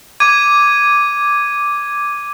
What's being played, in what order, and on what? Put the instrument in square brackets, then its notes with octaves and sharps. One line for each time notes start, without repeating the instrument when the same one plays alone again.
[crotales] D6 G#6 D#7